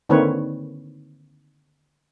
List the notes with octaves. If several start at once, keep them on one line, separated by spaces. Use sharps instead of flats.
D3 D#3 A#3 C4 B4 C#5